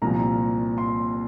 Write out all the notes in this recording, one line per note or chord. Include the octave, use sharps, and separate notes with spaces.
C2 A#2 F3 A#5
C6